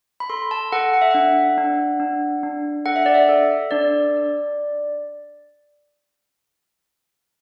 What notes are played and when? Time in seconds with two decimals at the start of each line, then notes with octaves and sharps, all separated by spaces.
0.20 B5
0.30 A4 C6
0.51 A5
0.72 A4 F#5
0.94 F#5
1.02 E5
1.11 D4 F#5
1.58 D4
2.00 D4
2.43 D4
2.86 A4 F#5
2.96 E5
3.06 D5
3.14 E5
3.29 A4
3.71 D4 D5